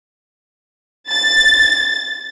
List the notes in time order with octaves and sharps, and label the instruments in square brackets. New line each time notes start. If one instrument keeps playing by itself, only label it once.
[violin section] A6